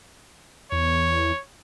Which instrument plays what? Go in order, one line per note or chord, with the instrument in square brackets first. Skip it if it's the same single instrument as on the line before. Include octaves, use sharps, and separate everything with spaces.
[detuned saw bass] E2 [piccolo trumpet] C#5